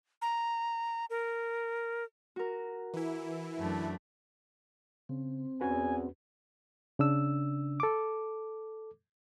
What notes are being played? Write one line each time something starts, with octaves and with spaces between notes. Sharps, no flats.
A#5
A#4
F#4 A#4
E3 E4
F#2 A3 D4
C#3 C4
E2 C#4 F#4 B4 G#5
C#3 D4 E6
A4 D6